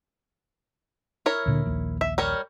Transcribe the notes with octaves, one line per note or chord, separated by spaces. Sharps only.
E4 A#4 C#5
D2 A#2 D3
A#1 D#2
E5
G3 A#4 C#5